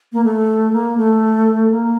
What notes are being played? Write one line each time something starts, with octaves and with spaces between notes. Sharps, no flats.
A#3
A3
A#3
A3
A#3